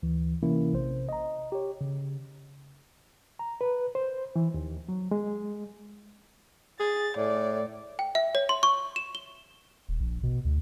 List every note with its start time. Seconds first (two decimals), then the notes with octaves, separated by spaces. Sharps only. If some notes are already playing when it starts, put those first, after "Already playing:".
0.03 D2 E3
0.43 C3 E3 A#3 C#4 E4 A#4
0.73 A#1 C3 C5
1.09 D#5 A#5
1.52 G4 C#5
1.81 C#3
3.39 A#5
3.61 B4
3.95 C5
4.36 E3
4.54 D#2
4.89 F#3
5.11 G#3
6.80 G#4 A6
7.17 A2 D5
7.99 G5
8.15 E5
8.35 C#5
8.49 C6
8.63 C#6
8.96 E7
9.15 G7
9.89 D#1
10.00 A#1
10.23 B2
10.45 D2